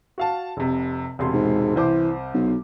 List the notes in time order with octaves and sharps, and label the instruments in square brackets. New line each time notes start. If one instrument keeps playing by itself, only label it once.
[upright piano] F#4 F5 A5
F1 C3
E1 C3 C6
[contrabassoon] G#2
[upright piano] C2 C5 D6 [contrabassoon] E3
[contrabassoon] B1